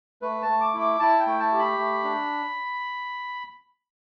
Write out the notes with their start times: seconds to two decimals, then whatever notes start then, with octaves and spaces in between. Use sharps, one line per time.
0.22 A3 B4
0.42 A5
0.48 A3
0.61 D6
0.74 E4
0.80 D6
0.99 E4 A5
1.19 G5
1.27 A3
1.40 A5
1.52 G4
1.59 B5
1.78 A3
2.04 D4